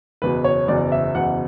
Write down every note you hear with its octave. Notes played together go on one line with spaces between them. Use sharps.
F#1 E2 B2 B4
C#5
F#1 E2 B2 D5
E5
F#1 E2 B2 F#5